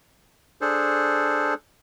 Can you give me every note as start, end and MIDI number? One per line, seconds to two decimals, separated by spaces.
0.61 1.54 62
0.61 1.54 68
0.61 1.54 69
0.61 1.54 72